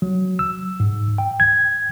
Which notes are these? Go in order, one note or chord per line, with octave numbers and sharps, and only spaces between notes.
F#3
E6
G#2
G5
G#6